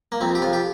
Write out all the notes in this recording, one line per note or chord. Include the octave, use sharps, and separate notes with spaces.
A#3
F2 C4
G4
F2 F4
G4